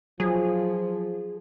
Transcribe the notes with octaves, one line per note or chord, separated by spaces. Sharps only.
F3 F#3 G#4